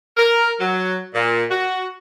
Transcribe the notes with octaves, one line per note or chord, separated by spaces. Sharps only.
A#4
F#3
A#2
F#4